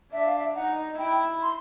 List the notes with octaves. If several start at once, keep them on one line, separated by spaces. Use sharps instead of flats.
D4 E5
F5
E5
D#4 F#5
E4 G5
C6